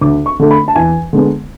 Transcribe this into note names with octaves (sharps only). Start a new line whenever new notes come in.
D2 D6
C#6
D3 A3
B5
A5
E2 G#5
D3 G#3 B3